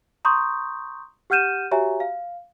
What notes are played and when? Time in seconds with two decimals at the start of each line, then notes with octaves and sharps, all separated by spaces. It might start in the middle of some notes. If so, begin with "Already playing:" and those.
0.25 A#5 C6 C#6 D#6 G6
1.30 G4 F#5 F6 G6 D#7 E7
1.71 F#4 G4 C#5 E5 G#5 A#5
2.00 F5